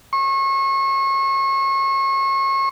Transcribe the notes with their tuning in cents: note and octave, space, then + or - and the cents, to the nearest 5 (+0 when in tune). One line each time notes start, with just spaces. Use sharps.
C#6 -35